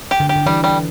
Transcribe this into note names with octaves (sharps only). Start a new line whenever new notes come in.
G4
D3
G4
D3
E3 G3
G3